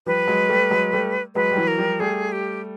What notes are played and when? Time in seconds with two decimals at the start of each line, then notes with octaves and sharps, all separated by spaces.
0.06 F3 G3 B4
0.27 F#3 G#3
0.49 G3 A3
0.70 F#3 G#3
0.93 G3 A3
1.35 F#3 G#3 B4
1.52 G3
1.56 E3 F#3
1.67 A#4
1.78 F3 G3
2.00 G3 A3 G#4
2.32 G4